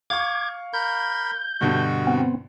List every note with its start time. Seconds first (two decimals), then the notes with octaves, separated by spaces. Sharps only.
0.10 F5 C#6 D6 G#6
0.73 A#4 B5 G6
1.61 G2 B2 D3 F#4
2.07 B3 C4